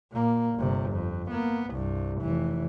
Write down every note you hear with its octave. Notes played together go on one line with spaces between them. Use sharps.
A#2 A#3
G1 C3
F2
A#3 B3
C2 G2
F1 E3